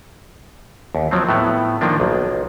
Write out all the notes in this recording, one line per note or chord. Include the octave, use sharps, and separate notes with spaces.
D#2
F3 F#3 C4
A2 A3 B3
D#3 F3 A#3 D4
B1